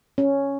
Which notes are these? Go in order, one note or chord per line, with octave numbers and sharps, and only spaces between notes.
C#4